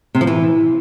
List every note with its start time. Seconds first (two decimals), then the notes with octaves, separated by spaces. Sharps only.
0.15 C3
0.21 F3
0.27 E3